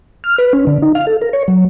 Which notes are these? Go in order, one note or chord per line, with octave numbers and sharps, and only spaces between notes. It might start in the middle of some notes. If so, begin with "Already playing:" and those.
F6
B4
C#4
D3
D#4
F5
A4
A#4
C#5
F#3